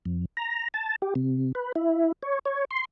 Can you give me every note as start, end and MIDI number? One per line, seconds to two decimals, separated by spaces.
0.05 0.25 41
0.37 0.68 82
0.74 0.96 81
1.02 1.14 67
1.15 1.52 48
1.55 1.72 71
1.76 2.12 64
2.22 2.39 73
2.45 2.65 73
2.71 2.85 84